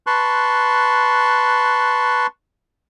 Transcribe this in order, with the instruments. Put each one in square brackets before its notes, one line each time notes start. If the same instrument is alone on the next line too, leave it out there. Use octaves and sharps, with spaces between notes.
[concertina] B4 A5 C6 C#6 F#6